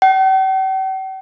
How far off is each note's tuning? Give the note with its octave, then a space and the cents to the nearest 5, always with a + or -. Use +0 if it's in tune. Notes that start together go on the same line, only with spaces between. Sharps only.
G5 -45